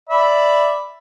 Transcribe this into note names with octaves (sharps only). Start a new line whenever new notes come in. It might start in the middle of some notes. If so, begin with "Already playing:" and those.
D5 E5 B5